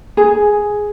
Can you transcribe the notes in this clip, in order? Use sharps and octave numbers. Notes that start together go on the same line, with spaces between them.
G#4